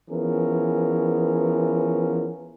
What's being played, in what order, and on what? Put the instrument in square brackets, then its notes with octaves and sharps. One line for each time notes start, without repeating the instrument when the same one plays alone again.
[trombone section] E3 F3 B3 C#4 G#4 A#4